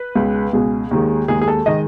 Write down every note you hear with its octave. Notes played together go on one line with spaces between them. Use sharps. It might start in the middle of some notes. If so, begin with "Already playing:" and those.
Already playing: B4
C#2 B2 G#3
C#2 B2 G#3 G#4
D#2 D#3 G#3
D#2 D#3 G#3 G#4
G#4
A4
D#3 G#3 D#5